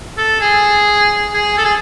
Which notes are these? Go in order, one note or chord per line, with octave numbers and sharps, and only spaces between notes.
A4
G#4
G#4
A4
G#4